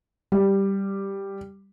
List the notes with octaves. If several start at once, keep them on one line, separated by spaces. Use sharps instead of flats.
G3